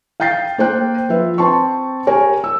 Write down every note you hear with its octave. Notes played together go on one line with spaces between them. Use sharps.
F5 G5 G6 A6 C7
A#3 C5 G5 F#6
F3 B4 E5
C4 A5 C6 C#6
G4 A#4 C#5 G#5
E6